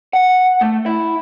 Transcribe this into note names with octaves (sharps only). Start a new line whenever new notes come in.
F#5
A3
E4